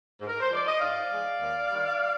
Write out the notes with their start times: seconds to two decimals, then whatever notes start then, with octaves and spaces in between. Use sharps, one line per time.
0.20 G#2
0.27 A#4
0.41 C5
0.50 F3 G#3 D5
0.66 D#5
0.79 G#2 D5 F5
1.09 F3 G#3
1.39 D#2
1.69 D#3 G3